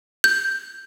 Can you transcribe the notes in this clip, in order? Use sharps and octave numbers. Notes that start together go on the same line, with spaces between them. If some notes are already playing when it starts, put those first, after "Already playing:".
G6